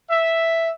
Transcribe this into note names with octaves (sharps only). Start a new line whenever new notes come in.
E5